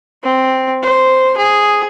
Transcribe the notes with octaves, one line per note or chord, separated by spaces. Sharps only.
C4
C5
G#4